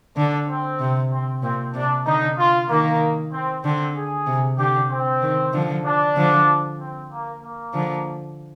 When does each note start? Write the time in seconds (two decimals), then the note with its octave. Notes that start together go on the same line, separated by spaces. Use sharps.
0.16 D3 D4
0.49 C4
0.80 C3
1.12 C4
1.42 A#2 C4
1.74 C3 D4
2.06 D3 D#4
2.38 F4
2.69 D#3 A#3
3.33 C4
3.64 D3 C4
3.96 G#4
4.26 C3
4.58 D3 G4
4.90 C4
5.22 D#3
5.53 D3 F3
5.85 D4
6.16 D3 F3
6.80 C4
7.11 A#3
7.43 A#3
7.74 D3 F3